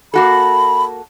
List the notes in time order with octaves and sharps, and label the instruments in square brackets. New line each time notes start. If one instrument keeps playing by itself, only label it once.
[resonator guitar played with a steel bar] A#3 F#4 A4 [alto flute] B5